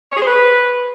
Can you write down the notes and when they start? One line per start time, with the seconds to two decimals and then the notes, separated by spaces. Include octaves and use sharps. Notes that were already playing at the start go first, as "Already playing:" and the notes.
0.11 C#5
0.17 G#4
0.22 C5
0.27 B4